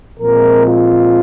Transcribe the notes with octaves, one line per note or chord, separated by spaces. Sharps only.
A#2 F3 G#3 C4 A#4
F4